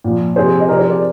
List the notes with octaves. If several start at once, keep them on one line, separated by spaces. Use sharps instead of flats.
A#2 F3
C3 F3 G#4 C5
D#5
C3 F3 A#4 D5
G#4 C5
A#4 D5